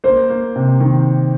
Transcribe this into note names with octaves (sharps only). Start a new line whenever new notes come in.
A#3 C5
A#3
C3
D#3